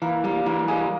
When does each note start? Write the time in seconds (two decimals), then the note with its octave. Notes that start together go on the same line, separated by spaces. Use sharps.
0.02 E3 A#3 A#4
0.24 G3 A#3 A#4
0.46 E3 A#3 A#4
0.68 G3 G#3 G#4